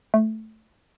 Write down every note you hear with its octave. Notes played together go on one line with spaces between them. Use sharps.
A3